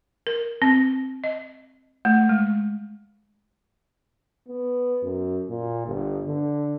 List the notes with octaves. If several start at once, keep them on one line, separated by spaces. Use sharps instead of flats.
A#4
C4
D#5
A3
G#3
B3
F#2
A#2
G1
D3